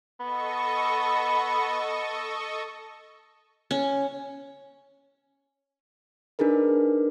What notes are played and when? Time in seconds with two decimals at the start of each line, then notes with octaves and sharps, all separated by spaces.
0.20 B3 A4 D#5 C#6
3.71 C#4
6.39 D4 D#4 G#4 A#4 B4